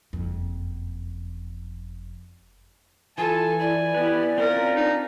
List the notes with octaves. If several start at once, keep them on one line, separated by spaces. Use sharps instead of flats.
F#1 F2
E3 F4 A4 G#5 A5
E4 D5
B3 E4 G4 B4
C4 C#4 F4 A#4
D4 D#4